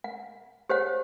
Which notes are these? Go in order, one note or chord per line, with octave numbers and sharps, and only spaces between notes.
F#5
G4 C5 C#5 F#5